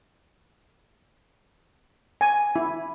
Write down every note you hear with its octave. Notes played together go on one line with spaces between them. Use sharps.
G#5
E4